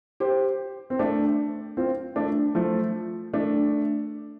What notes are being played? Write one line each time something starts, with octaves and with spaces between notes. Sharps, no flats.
G4 C5
C4
A3 D4
C4 F4
A3 D4
F3 A3
A3 D4